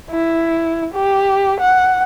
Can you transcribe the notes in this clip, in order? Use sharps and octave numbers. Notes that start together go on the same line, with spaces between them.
E4
G4
F#5